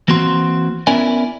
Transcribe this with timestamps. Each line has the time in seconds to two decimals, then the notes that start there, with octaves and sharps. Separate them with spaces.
0.08 E3 A#3 C4 F#4 C6
0.87 B3 C#4 E4 A#4 D5 G#5